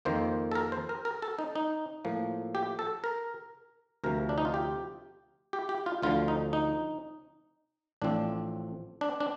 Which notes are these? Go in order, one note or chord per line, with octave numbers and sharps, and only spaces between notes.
F2 D#3 A#3 C5
A4
A#4
C5
A#4
A#4
A4
D#4
D#4
A2 F3 A#3
G4
A4
A#4
D2 C3 F3 A#4
D4
D#4
F4
G4
G4
G4
F4
D2 D3 F3 F4
D#4
D#4
A1 A2 F3 C4 D4
D4
D4